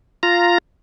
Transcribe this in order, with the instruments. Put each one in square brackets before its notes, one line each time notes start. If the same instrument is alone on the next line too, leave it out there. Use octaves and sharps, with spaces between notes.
[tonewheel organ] F4 A#5